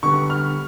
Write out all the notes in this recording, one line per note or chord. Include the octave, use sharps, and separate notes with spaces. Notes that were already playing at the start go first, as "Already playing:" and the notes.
D3 G3 B3 C#6
F6